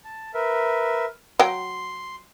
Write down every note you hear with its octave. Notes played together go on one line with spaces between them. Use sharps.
A5
A#4 B4 E5
F#3 G5 C6